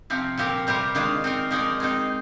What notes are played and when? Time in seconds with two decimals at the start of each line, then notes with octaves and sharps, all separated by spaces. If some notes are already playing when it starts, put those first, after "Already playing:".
0.10 C3 F3 C4
0.38 A#2 F3 C4 G4 A#4
0.67 C3 G3 C4 G4 A#4
0.95 D#3 G#3 D4 F4
1.24 C4 D#4 A#4
1.51 F3 G#3 D#4 A#4 D5
1.80 G#3 C4 D#4